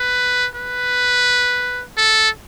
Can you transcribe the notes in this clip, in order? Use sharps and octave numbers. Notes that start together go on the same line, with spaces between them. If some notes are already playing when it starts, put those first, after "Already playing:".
Already playing: B4
B4
A4